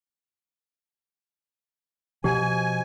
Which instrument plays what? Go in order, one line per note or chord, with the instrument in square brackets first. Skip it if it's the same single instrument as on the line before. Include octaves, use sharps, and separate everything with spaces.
[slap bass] B2 F3 [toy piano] G4 [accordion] G#5